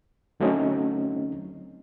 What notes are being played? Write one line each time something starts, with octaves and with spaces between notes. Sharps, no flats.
D3 F#3 A3 C4 C#4 D#4